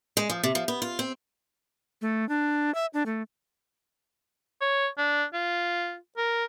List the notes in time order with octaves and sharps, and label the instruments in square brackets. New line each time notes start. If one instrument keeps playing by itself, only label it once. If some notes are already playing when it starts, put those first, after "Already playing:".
[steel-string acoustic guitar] G#3
F3
C3
F3
B3
F4
C4
[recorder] A3
D4
E5
D4
A3
[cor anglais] C#5
D4
F4
A#4